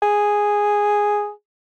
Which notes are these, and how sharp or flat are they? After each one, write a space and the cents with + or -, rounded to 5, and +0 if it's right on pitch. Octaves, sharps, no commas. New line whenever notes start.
G#4 -5